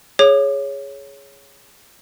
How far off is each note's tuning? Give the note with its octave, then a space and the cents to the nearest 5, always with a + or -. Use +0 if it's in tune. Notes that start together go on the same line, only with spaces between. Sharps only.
G#4 +0 C#5 +0 D6 +30